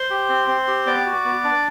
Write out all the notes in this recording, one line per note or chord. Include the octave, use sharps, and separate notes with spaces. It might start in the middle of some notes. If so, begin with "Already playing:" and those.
Already playing: C5 C6
G4
C4
C4
G4
B3 D5 D6
F#4
B3
D4